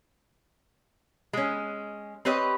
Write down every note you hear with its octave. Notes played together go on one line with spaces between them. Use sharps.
G#3 C#4
C4 G4 B4 C#5 D#5